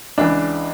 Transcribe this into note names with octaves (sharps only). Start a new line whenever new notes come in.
C#2 C#3 E3 D4